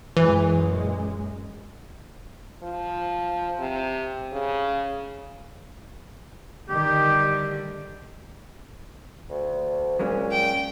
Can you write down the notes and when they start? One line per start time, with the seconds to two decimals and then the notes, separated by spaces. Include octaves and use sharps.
0.17 F#2 A#2 E3 G#3
2.63 F3
3.60 C3
4.32 C#3
6.69 D3 D#3 G3 G4
9.29 D2
9.99 A#2 F#3 G#3 C#4
10.31 G5